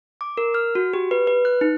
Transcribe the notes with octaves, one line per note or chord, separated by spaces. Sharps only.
D6
A#4
F6
F#4
G4
B4
B4
F#6
D#4